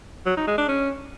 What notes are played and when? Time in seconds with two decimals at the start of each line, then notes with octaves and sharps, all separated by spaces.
0.26 F#3
0.37 D#4
0.47 G#3
0.58 D4
0.69 C#4